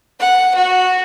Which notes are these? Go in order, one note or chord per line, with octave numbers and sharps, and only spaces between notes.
F#5
F#4